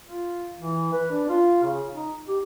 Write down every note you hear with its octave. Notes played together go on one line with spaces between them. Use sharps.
F4
E3
B4
D4
F4
C#3
D#4
G4